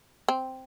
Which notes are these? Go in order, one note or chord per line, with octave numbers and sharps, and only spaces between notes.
C4